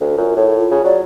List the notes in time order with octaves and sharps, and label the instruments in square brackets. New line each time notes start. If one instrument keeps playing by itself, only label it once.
[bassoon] D2
[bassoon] F#2 [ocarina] F4
[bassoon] A2 [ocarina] C#5
[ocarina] F4
[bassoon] C#3
[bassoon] F#3 [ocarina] D5